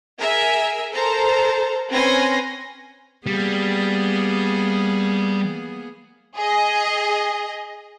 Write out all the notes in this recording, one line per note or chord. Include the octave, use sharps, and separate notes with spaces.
G#4 A#4 E5 G#5
A4 A#4 C5 A5 A#5
C4 C#4 B4 G#5 C6 A#6
G3 A#3 B3 G#4
G#4 D#5